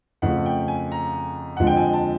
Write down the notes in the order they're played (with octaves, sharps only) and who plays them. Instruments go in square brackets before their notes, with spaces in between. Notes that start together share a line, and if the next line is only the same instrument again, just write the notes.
[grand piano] F2 C#3 F3 A3 F#5
G5
G#5
A#5
F2 D3 F3 G#3 F#5
G5
G#5
A5